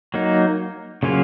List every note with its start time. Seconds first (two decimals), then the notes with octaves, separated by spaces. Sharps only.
0.14 F#3 A#3 D#4
1.03 C#3 F#3 A#3 C#4 F4